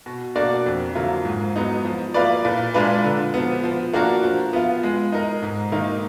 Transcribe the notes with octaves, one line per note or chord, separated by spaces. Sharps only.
B2
A#3 D4 F#4 D5
F2
D3 F#3 A#3 F4
G#2
F#3 B3 D#4
F3
A#3 F4 B4 D5
A#2
G#3 D4 F4 B4
D3
F3 B3
F3
A#3 D4 F#4 A#4
F3
B3 F4
G#3
D#4 A#4 D#5
G#2
D#3 A#3 D#4 A#4